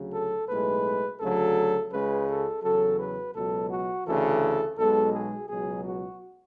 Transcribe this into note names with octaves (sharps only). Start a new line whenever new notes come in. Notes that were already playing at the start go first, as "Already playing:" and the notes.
Already playing: D2 C#3 F#3
A4
B1 A2 G#3 B4
D2 C#3 F#3 A4
C#2 C#3 G#3 B4
A4
E2 C#3 F#3 A4
B4
C#2 B2 F#3 A4
F#4
D2 C#3 E3 A4
B1 B2 G#3 A4
G#4
C#2 B2 F#3 G#4
F#4